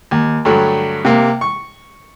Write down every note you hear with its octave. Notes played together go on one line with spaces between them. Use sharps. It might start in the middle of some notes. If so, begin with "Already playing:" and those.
D#2
G2 D3 F#3 A3
C3 A#3
C#6